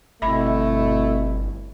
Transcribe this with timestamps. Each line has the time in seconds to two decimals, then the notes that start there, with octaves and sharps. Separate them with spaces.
0.22 G1 B2 A3 C4 E4 E5 B5